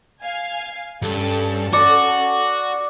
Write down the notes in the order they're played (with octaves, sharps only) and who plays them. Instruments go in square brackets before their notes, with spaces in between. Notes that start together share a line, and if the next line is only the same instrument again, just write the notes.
[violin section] F5 G#5 G#6
[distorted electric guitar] G2 [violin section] C#4 A4
[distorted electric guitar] F#4 [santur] D5